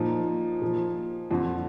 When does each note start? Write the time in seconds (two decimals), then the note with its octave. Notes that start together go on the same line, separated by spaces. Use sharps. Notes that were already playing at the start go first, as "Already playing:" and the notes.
Already playing: A#2 F3 D#4
0.62 A#2 F3
1.31 F2 D3 F3